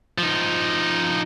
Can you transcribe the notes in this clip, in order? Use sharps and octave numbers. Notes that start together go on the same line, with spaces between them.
F3 D#4